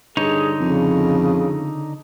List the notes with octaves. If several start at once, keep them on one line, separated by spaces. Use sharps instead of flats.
G2 D3 D#4 G#4 C#5
F2 C#3